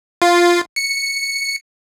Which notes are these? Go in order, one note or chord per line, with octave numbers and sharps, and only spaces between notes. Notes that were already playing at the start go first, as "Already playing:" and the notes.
F4
C#7